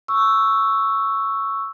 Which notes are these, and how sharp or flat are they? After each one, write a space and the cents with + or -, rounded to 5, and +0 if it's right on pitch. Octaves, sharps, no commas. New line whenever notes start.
C#6 +0 E6 +0